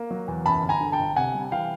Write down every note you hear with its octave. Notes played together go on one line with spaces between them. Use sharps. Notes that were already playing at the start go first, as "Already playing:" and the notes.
Already playing: A#3
F#3
E2
F#2 A5 B5
G1
G#5 A#5
D3
G5 A5
G1
C3 F#5 G#5
G3
E3 F5 G5